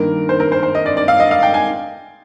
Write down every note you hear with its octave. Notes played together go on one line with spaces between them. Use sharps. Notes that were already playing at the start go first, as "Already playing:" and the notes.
Already playing: G2 D#3 A#3 A#4
C5
A#4
C5
C5
D#5
D5
D5
F5
D#5
F5
G5
G#5